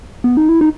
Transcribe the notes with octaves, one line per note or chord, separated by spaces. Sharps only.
B3
D#4
E4
D#4